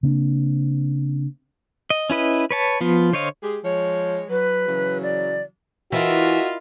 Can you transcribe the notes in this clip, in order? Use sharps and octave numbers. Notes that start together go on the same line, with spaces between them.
C#3 A#3 C4 D4
D#5
C#4 E4 B4 D#5
B4 C#5 A5
F3 B3 F4
D3 C5 C#5 D#5 F5
G#3 G4 G#4
F3 G#3 C#5
F#3 B4
C#3 E3 F#3
D5
E3 F4 F#4 A#4 D#5 E5